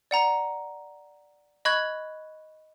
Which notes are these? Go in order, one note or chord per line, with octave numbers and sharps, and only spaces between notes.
D5 F#5 A#5
D#5 B5 C#6 F#6 G#6